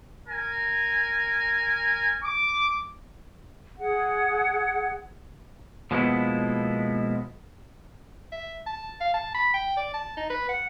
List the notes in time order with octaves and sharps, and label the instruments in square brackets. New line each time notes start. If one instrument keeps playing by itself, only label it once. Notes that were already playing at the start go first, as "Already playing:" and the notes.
[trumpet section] A#4 G#5
D6
[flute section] G#4 F#5
[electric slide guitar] B2 F3 G#3 A#3 B3 E4
[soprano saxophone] E5
A5
F5
A5
B5
G5
D5
A5
D#4
B4
F#5